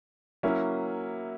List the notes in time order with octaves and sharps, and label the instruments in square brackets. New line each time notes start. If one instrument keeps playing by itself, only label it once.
[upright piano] F#3 A#3 C#4 E4